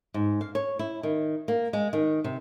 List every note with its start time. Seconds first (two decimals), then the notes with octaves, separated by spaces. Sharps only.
0.14 G#2
0.41 F5
0.55 C#5
0.79 E4
1.03 D#3
1.48 A#3
1.73 G#3
1.93 D#3
2.24 C3